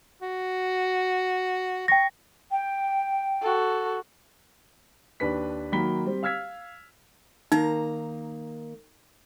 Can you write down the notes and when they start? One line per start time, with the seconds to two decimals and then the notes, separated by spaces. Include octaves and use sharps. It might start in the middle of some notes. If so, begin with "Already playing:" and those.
0.22 F#4
1.88 G5 C#6 A#6
2.51 G5
3.41 F#4 A4
5.20 D#2 D4 B4 B6
5.72 D#3 F#3 A#3 B5 B6 G7
6.05 G3 C4
6.23 F5 E6 F6 G#6 B6
7.52 D#3 A#3 D#4 A#5